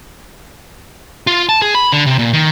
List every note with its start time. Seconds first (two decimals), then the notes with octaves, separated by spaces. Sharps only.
1.27 F4
1.49 A5
1.62 G#4
1.75 B5
1.93 D3
2.06 C3
2.19 A#2
2.33 D#3